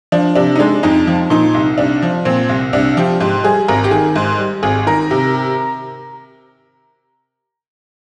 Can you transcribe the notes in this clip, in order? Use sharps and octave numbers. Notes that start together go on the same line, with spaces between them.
F3 D4
C3 D4
D#4
G#3 D4
F2 D#4
F3
A#2 D#4
C2
C2 D4
F3
A#2 C4
C2
C2 D4
F3 G4
G#2 G4
G3 G#4
G#1 A#4
G4
D#3 G#4
G#2
G3
G#1 G#4
D#3 A#4
C3